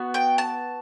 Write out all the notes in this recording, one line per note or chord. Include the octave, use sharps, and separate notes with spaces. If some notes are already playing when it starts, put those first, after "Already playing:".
Already playing: B3 F#4
G5
A5